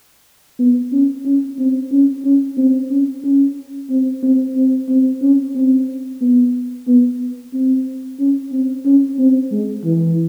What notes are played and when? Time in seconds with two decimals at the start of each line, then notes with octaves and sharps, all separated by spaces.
0.59 B3
0.92 C#4
1.25 C#4
1.58 C4
1.92 C#4
2.25 C#4
2.58 C4
2.91 C#4
3.24 C#4
3.90 C4
4.23 C4
4.55 C4
4.89 C4
5.22 C#4
5.55 C4
6.21 B3
6.87 B3
7.53 C4
8.19 C#4
8.52 C4
8.85 C#4
9.19 C4
9.52 G#3
9.84 E3